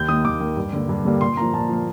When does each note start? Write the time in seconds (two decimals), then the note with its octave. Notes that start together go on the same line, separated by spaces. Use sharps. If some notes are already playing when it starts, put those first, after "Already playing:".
Already playing: D#2 G6
0.08 D#3 A#3 D#6
0.25 D#2 D6
0.40 D#3 A#3
0.57 G2
0.73 D3 G3 A#3
0.89 G2
1.05 D3 G3 A#3
1.21 A#2 C6
1.37 F3 A#3 A#5
1.53 A#2 A5
1.69 F3 A#3